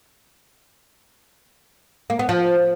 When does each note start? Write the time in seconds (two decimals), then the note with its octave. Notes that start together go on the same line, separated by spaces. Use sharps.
2.10 A#3
2.19 B3
2.29 F3